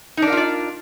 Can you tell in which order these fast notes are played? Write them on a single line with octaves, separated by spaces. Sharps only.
D#4 D4 A#4 F4 D5